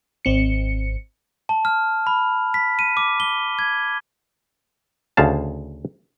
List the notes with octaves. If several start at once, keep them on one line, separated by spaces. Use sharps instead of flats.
G#1 C4 C#7
A5
F6
B5
B6
D#7
D6
G7
G#6
D2 C#3 F5 A5